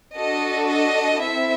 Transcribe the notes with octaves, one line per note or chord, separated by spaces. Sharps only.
D4 F#4 A4 D#5
D#5
C4 E4 A4 E5